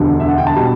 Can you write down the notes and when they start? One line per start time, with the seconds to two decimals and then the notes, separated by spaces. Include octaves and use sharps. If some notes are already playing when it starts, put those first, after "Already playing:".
Already playing: E1 D2 D3 G3
0.20 E5
0.29 F#5
0.38 G5
0.47 A5
0.55 B2 G3